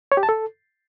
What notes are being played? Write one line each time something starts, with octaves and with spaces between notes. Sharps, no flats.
C#5
G4
A5
A4